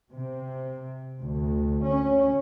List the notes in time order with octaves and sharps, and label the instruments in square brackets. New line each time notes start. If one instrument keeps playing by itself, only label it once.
[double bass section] C3
D2
C#4